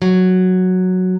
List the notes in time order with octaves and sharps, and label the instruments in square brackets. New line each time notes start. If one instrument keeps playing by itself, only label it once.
[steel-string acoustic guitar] F#3